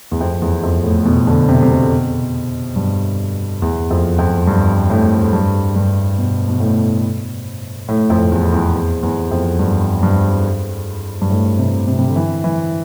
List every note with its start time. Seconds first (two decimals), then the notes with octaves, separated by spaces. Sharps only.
0.12 E2
0.21 F2
0.42 E2
0.63 F2
0.84 A2
1.05 B2
1.27 D3
1.49 C3
1.62 C3
1.70 B2
2.76 G2
3.62 E2
3.90 F2
4.18 F2
4.47 G2
4.90 A2
5.33 G2
5.76 G2
6.18 B2
6.49 B2
6.60 A2
7.88 A2
8.10 F2
8.32 E2
8.52 E2
8.74 E2
9.03 E2
9.31 F2
9.59 G2
10.03 G2
11.21 G2
11.30 A2
11.59 C3
11.88 C3
11.99 C3
12.07 D3
12.16 E3
12.44 E3